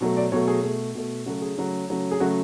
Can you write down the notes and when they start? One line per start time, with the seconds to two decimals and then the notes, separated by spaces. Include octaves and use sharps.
0.01 B2 F#3 A3
0.17 D5
0.32 B2 F#3 A3 C#5
0.48 G#4
0.63 B2 A3
0.95 B2 A3
1.26 C#3 F#3 A3 F#4
1.42 G#4
1.58 C#3 F#3 A3
1.89 C#3 F#3 A3
2.11 G#4
2.20 C#3 F#3 A3 F#4